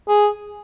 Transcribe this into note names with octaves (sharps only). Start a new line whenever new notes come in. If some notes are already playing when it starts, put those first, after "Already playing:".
G#4